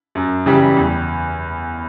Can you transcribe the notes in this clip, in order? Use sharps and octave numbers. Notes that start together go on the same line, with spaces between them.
F#2
C#3 E3 G3
E2